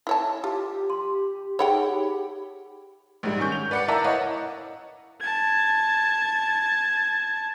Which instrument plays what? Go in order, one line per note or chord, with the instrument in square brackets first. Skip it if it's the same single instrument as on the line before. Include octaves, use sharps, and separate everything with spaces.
[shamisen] E4 C#5 A5
[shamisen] F4 [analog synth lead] G4
[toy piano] C6
[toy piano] D#4 G#4 B5 [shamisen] C#5 F#5 G5
[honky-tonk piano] A#1 G#2 G3
D#3 C#4 C#6 G6
F7
B4 D5 F#5 D6 C#7
E4 A#4 D5 E5 A5 A#5
E4 B4 C#5 D#5 F5 F#5
[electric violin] A5 G#6